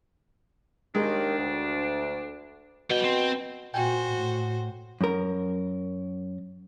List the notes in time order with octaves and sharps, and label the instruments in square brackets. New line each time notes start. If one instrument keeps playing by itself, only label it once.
[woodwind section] D#2 D#3 [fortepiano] G#3 [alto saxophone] D4
[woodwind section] D2
[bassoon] B2 [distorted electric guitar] G3 G5
[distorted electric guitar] C4
[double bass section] A#2 [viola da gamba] F#4 C5 [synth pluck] G5 G#5
[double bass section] A2
[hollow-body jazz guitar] F#2 A#4